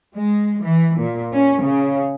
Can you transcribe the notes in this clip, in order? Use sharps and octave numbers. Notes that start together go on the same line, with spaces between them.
G#3
E3
A#2
C#4
C#3